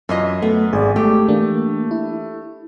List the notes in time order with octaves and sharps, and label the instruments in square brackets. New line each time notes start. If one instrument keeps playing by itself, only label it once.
[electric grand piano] F#2 [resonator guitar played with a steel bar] E3 F4 D#5
[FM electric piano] A3 [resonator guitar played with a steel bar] B3
[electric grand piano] G#1 [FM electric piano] G#4 D5
[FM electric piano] G#3 [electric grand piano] A3 [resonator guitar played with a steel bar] G4
[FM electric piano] E3 A#3 D4
E4